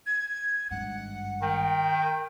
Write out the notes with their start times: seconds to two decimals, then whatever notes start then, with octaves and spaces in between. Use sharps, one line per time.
0.07 G#6
0.71 G#1 G2 F#5
1.42 D#3 G5